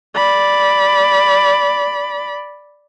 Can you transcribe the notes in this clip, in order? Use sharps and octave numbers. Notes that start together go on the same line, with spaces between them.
D5 B5